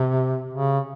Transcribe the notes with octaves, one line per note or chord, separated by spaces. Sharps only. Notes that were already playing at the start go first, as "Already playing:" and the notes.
Already playing: C3
C#3